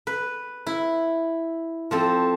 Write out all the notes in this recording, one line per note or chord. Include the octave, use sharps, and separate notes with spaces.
B4
E4
F3 C4 A4